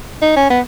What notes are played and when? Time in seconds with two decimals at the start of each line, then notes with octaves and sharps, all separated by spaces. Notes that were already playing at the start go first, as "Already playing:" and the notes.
0.22 D#4
0.37 C#4
0.50 B3